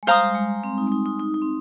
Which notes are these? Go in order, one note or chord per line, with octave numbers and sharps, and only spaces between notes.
G#3
G3 C5 F5 A#5 D#6
G#3
C4
D#4
D#4
D#4
D#4
D#4
C4